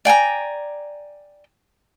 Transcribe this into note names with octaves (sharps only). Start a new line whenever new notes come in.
D5 G5 G#5 A#5